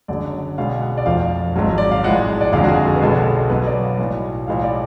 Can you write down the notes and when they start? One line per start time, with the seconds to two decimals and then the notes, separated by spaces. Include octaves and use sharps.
0.08 F#1 F#2 D3 F#3 D5
0.58 B1 B2 G#3 F5
0.82 F#5
0.97 D5
1.06 F1 F2 F3 F5
1.56 G#1 G#2 F#3
1.78 D5
1.91 F5
2.04 B1 A2 F3 G#3 F#5
2.41 D5
2.53 F#1 F2 D3 G#3 F5
2.64 F#4
2.68 G#4
2.85 A4
2.96 B4
3.01 B1 B2 G#3 A4
3.49 B1 B2 F#3 B4
3.67 D5
3.83 F5
3.98 B1 A2 F#3
4.47 B1 A2 F3 G#3 F5
4.58 F5
4.64 D5